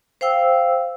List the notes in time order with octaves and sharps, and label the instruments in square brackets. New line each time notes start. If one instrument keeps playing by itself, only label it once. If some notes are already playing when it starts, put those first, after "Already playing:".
[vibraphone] C5 F5 G5 E6